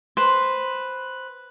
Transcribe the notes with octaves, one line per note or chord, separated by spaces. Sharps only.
B4 C5